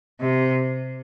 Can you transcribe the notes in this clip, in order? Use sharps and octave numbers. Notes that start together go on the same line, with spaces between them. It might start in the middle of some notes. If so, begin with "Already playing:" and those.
C3